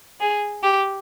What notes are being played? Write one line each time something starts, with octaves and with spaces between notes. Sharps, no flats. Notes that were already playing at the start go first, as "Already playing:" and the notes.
G#4
G4